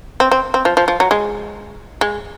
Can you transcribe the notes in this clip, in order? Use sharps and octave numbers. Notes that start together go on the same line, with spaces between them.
C4
C4
C4
F3
F3
F3
F#3
G#3
G#3